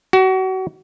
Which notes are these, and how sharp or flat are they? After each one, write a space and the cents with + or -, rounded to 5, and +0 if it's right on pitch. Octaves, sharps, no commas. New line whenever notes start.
F#4 +30